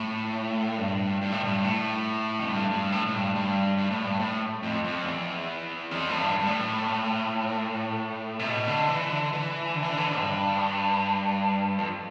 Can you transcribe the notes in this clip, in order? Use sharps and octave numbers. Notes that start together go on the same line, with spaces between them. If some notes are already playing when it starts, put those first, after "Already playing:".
Already playing: A2
G2
G2
A2
G2
A2
F2
G2
G2
A2
A2
G2
G2
G2
A2
G2
A2
F2
F2
E2
F2
A2
G2
G2
A2
C3
B2
D3
E3
D3
E3
D3
E3
D3
E3
D3
G2
F2